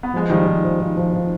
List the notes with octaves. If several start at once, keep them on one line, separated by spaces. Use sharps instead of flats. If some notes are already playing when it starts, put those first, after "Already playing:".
B3
F3 G#3
D#3 F3 G3
F3
F3
F3
F3
F3